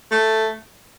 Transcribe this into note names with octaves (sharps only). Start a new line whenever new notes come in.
A3